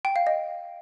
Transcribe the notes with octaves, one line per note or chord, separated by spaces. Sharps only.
G5
F5
D#5